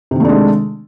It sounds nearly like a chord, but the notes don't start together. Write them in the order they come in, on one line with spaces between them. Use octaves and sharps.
C3 D#3 A3 D4 G#3